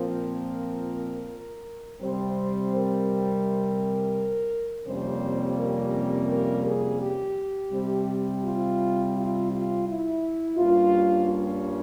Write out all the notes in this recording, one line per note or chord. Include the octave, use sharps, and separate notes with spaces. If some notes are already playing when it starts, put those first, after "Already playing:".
Already playing: A#2 F3 C4 A#4
C3 G3 C4 C5
A#4
F2 C3 G3 A#3 C#4 C5
A#4
A#4
G#4
G4
C3 G3 C4
F4
F4
F4
E4
G2 G3 A#3 C#4 F4
F4